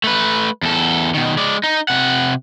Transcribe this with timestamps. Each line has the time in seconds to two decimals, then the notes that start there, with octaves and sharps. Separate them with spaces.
0.04 A3 B4
0.63 E2 A4
1.14 B2 D#3
1.37 G#3 D5
1.64 D#4
1.88 C3 F#5